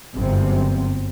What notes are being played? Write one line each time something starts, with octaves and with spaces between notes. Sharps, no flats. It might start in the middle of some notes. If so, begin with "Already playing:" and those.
G1 F#2 C3 C4